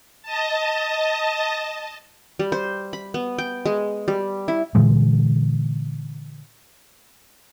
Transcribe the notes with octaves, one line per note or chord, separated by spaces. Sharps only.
D#5 A5
G3
C5
B5
B3
G5
G#3
G3
E4
A#2 D3 E3 G#3